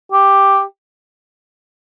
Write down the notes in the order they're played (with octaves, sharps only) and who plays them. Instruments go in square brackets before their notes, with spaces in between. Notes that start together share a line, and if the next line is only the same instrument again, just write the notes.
[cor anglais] G4